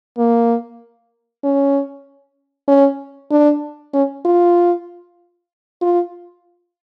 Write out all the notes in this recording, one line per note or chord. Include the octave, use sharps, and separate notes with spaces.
A#3
C#4
C#4
D4
C#4
F4
F4